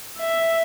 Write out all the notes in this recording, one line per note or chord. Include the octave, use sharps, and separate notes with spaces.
E5